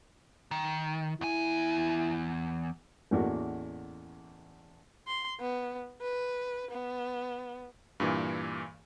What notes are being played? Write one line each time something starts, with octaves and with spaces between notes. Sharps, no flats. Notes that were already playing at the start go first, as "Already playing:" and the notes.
D#3
E2 E4 G#5
A1 E2 A#3 F#4
C6
B3
B4
B3
G2 A#2 E3